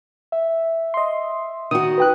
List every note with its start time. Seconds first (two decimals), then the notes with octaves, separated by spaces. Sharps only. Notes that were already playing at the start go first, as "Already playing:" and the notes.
0.32 E5
0.94 D#5 C6
1.71 D#3 F#4 D#6
1.98 B4 G5 F#6